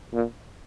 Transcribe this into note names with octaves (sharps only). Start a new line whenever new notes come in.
A#2